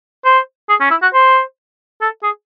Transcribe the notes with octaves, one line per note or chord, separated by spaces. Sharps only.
C5
G#4
C#4
E4
F#4
C5
A4
G#4